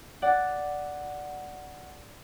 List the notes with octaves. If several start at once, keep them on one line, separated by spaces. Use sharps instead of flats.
D5 F#5